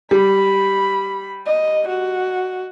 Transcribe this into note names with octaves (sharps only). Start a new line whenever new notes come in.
G3 B5
D#5
F#4